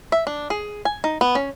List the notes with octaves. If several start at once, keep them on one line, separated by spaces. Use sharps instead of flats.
E5
D4
G#4
G#5
D#4
B3
C#4